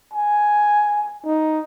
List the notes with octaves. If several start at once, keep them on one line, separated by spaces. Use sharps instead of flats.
G#5
D#4